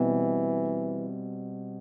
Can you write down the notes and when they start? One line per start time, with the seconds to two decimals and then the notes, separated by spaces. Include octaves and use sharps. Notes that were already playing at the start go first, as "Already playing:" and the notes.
Already playing: B2 E3 G3 C4